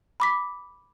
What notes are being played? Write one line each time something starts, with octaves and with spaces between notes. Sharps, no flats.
B5 D6 B6